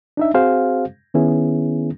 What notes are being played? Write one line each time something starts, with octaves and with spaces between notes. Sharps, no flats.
D4 D#4 E5
C4 F#4 G#4 C5 F5
D#3 B3 C#4 E4 G#4